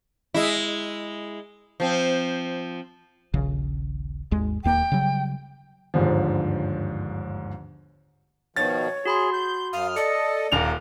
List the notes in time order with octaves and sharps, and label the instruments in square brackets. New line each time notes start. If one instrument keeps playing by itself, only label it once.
[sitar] G#3 E4
F3 C4
[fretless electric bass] D#1 A#1 C#3
G#1 D#2 G#3
[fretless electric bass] D1 D#2 A#3 [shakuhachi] G5
[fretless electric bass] C#3 F#3 G3
[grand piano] G1 D#2 G#2 D3 F3
[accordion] B2 D#3 F3 [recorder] C#5 [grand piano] A6
[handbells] F#4 B5 C6 [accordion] G#4
[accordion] G6
[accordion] F#2 D#6 F6 [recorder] F5
[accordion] A4 D#5 [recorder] D5 [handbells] C#7
[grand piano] D#1 F7 [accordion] A#3 A#4